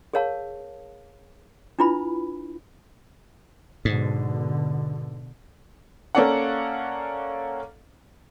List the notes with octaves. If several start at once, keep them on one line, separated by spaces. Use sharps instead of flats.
G#4 A#4 C#5 F5 A5
D4 E4 F4 B4 B5
G#2 B2 D3
A#3 C#4 A4 D5 F5 F#5